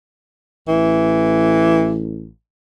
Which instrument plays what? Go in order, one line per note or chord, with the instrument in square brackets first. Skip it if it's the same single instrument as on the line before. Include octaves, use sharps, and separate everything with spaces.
[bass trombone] A1 [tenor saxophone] E3